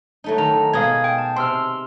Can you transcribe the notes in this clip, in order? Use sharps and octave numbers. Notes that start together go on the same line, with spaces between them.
F#3 A3 D#4
D#3 A#5
B2 G#3 F5 A#5 D#6 G#6
G5
A5
C3 C6 E6 F6